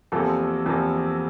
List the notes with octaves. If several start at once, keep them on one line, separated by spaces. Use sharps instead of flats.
E2 C3 F3 A#3 A4
E2 C3 F3 A#3